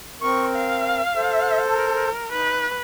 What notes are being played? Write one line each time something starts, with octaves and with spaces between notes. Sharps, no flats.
C4 A#4 C#6
F5
A4 C5
A#4
D#4 B4